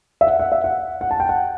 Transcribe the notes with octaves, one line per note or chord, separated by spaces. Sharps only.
E5
F#5
F#5
E5
F#5
F#5
A5
G5
F#5